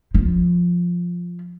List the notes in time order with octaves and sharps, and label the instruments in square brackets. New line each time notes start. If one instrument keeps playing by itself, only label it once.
[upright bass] F3